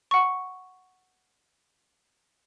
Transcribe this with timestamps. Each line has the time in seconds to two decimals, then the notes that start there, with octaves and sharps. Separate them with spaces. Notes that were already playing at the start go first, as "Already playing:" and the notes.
0.11 F#5 C#6